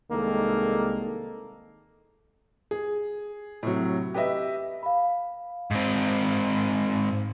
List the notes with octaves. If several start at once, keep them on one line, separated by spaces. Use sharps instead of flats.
C2 D#3 G#3 A#3 A4
G#4
A2 C3 F#3
G4 B4 D#5 E5
F5 B5
G#2 C4